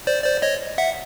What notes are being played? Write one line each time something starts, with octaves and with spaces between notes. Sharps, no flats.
C5 D5
C5 D5
C#5 D#5
E5 F#5